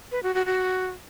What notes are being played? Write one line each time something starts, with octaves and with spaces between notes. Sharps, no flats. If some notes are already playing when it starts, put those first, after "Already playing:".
B4
F#4
F#4
F#4